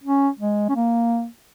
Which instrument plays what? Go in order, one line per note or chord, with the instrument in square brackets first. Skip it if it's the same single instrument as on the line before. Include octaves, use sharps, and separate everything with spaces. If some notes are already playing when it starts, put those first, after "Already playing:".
[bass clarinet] C#4
G#3
C#4
A#3